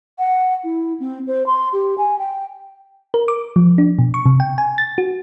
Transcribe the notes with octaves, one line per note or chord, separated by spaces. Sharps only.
F#5
E4
C4
C5
C6
G4
G#5
G5
A#4
D6
F3
D4
B2
C#6
C3
G5
G#5
A6
F#4